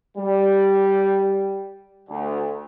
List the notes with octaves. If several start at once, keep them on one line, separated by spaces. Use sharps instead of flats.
G3
D2